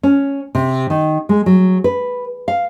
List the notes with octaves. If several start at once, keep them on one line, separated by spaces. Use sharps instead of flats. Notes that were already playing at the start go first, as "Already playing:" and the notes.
C#4
C3
D#3
G#3
F#3
B4
F5